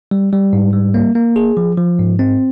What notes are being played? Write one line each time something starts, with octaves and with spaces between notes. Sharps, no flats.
G3
G3
G#2
G3
A#3
A#3
G#4
F3
F3
G#2
C4